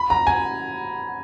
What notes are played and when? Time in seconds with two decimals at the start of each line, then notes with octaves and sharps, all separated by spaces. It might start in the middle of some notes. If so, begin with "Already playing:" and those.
Already playing: B5
0.10 A#5
0.27 G#5